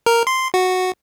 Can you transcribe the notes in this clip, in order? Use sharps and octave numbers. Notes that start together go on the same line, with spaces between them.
A#4
C6
F#4